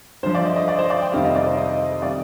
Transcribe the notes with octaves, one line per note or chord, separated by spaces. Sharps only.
G2 D3 F3 C5
D5
D#5
D#5
D5
C5
D5
G5
F2 C3 D#3 G3 F5
D#5
D5
C5
D#5
C3 D#3 G3 D5